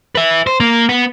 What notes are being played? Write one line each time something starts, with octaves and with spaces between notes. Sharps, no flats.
B4 E5
C5
A#3
B3